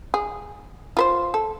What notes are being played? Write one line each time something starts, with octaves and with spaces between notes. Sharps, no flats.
G#4
F4 B4 C5
A4